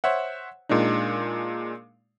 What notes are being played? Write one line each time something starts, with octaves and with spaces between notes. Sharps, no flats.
C5 C#5 E5 F#5
A#2 G#3 D4 D#4